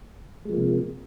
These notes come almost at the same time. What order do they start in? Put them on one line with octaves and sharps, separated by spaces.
G#3 F3 A#3 C3